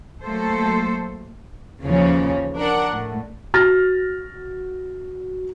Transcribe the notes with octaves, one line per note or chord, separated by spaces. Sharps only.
F#3 A3 A#3 A4 C5
D#2 C#3 E3 F3 C#4
D4 A#4 F#5
A2
F#4 F6 A6 A#6